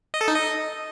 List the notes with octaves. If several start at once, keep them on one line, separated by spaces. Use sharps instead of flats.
D#5
A4
D#4
D#5